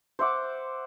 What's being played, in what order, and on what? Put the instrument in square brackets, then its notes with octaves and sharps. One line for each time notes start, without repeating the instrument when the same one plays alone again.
[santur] C5 E5 F#5 D6